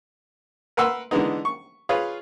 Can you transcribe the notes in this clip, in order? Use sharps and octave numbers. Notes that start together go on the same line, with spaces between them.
A#4 B4 F#5 C6 E6
D3 E3 G#3 B3 D#4
C#6
F4 G#4 B4 C#5